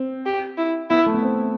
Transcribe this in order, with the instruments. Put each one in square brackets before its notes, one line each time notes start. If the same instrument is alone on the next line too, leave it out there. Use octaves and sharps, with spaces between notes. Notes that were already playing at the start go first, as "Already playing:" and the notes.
Already playing: [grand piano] C4
[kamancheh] G4
E4
[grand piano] B3 [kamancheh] E4
[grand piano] A3
B3
C4